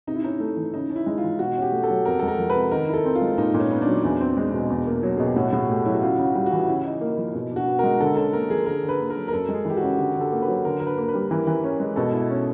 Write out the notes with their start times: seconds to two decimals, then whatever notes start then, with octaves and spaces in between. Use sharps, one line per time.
0.07 C3 D#4
0.15 E4
0.24 C#4 D#4
0.40 A3
0.57 E3
0.73 C#3 D#4
0.90 C#4
0.96 E4
1.06 G#3
1.18 F4
1.23 E3
1.39 B2 F#4
1.57 C#4
1.62 G4
1.72 A3
1.84 A4
1.90 F#3
2.05 F2 A#4
2.19 G#3 A4
2.28 A#4
2.39 F3
2.50 B4
2.55 C3
2.71 D#3 A#4
2.89 E4
2.94 A4
3.05 C4
3.15 F4
3.22 G#3
3.38 A#2 D#4
3.54 A#2
3.60 C#4
3.71 B3
3.82 D4
3.87 F#3
4.04 E2
4.20 C4
4.37 G#3
4.53 B2
4.70 E2
4.87 A#3
5.03 F#3
5.17 B2 G#4
5.26 G4
5.36 A2 F#4
5.52 A2 G#4
5.69 A3 G4
5.85 F#3 E4
5.95 F#4
6.02 C#3 F4
6.18 C#3
6.24 F#4
6.35 G3
6.46 F#4
6.52 E3
6.68 C#3 E4
6.85 D#4
7.01 A#3
7.18 F3
7.35 B2
7.51 D4 F#4
7.67 B3
7.79 G#3 A#4
8.00 D3 A4
8.16 C#4 A4
8.33 A#3 A#4
8.50 F3 G#4
8.66 D3 A#4
8.83 D3
8.89 B4
9.00 A#3
9.10 A#4
9.16 F#3
9.28 A#4
9.32 F#2 A4
9.49 G#3
9.54 G#4
9.65 E3 G4
9.77 F#4
9.82 C#3
9.99 D3 G4
10.15 D3
10.21 A4
10.32 A#3
10.42 B4
10.48 F#3
10.65 D3 A#4
10.80 D3 A#4
10.87 B4
10.98 A#3
11.04 A#4
11.09 B4
11.14 G3
11.31 E3 A#4
11.47 E3
11.64 C#4
11.80 G#3
11.96 B2 A4
12.13 E4
12.30 C#4